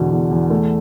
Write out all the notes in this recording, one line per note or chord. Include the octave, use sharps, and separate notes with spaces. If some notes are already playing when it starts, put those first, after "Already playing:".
Already playing: E2 B2 D3
E2
E2
A3